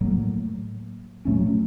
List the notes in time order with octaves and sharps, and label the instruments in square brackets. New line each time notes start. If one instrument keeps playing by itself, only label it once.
[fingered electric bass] A2 F#3 A#3
A#2 F#3 A3 C#4